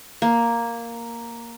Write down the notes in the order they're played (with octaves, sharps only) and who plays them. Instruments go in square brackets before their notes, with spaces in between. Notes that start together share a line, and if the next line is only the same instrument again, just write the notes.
[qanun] A#3